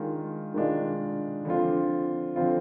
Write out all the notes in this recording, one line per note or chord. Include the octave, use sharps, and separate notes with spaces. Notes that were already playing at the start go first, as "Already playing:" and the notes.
Already playing: D#3 G#3 D4 F4
D#3 G#3 D4 F4
D3 F3 C4 F4
D3 F3 C4 F4